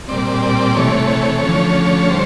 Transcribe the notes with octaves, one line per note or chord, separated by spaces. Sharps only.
A#2 G3 C4 D5
D5
C3 E3 A3 C#5
D3 F3 A3 C#4
D3 G3 C5